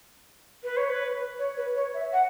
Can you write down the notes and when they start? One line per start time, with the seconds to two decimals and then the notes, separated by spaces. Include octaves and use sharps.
0.64 B4
0.77 C#5
0.89 B4
1.39 C#5
1.57 B4
1.76 C#5
1.94 E5
2.13 F#5